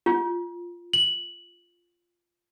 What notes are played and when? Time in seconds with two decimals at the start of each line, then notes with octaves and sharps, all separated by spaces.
0.06 F4
0.93 F#7